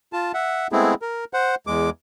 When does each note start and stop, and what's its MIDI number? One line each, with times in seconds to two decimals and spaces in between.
0.13 0.32 65
0.13 0.32 81
0.34 0.67 76
0.34 0.67 78
0.72 0.94 56
0.72 0.94 57
0.72 0.94 59
0.72 0.94 60
0.72 0.94 64
0.72 0.94 68
1.02 1.25 70
1.33 1.55 72
1.33 1.55 78
1.67 1.90 40
1.67 1.90 56
1.67 1.90 86